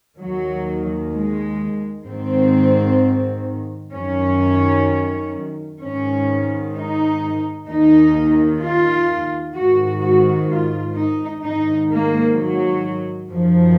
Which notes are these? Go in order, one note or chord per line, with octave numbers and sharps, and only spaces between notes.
D#2 D#3 F#3
G#3
G#2 D#3 C4
F#2 D#3 C#4
G#2 D#3 C#4
D#4
D#2 D#3 D#4
F4
G#2 D#3 F#4
F#4
F4
D#4
G#2 D#3 D#4
A#3
F#3
F#2 D#3 F3